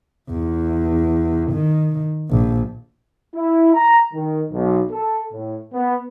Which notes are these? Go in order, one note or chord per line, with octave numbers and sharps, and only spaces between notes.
E2
D#3
A#1
E4
A#5
D#3
B1
A4
A2
B3